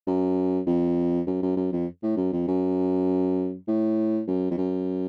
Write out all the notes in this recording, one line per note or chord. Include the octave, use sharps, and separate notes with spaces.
F#2
F2
F#2
F#2
F#2
F2
A2
F#2
F2
F#2
A2
F#2
F2
F#2